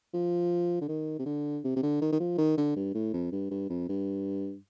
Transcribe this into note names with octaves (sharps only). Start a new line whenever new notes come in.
F3
D3
D#3
C3
D3
C3
C3
D3
D#3
D#3
F3
D#3
D3
G2
A2
F2
G2
G2
F2
G2